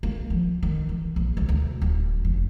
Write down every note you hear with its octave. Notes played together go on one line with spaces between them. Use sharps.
A#3
F3
D#3
E3
A#1
C2
D2
D1
F1